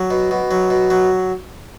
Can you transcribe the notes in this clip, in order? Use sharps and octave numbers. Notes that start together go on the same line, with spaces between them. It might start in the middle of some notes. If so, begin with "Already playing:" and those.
Already playing: F#3
B2
B2
F#3
B2
F#3